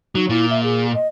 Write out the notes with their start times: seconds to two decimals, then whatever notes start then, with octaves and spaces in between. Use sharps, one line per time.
0.15 F#3 D#4
0.29 A#2 E4
0.50 E5
0.63 G#4
0.94 D#5